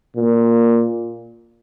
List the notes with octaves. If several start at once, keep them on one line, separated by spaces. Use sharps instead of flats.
A#2